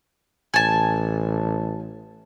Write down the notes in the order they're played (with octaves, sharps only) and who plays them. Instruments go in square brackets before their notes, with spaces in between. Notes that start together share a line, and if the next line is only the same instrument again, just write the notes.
[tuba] A1 [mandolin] G#5 A5